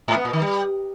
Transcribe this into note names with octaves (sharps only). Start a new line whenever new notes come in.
G#2
B3
A#2
D#3
G3